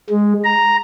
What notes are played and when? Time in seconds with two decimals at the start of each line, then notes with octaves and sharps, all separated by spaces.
0.10 G#3
0.44 A#5